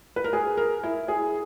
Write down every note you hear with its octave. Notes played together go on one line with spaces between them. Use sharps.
B4
A#4
G#4
A#4
E4
G#4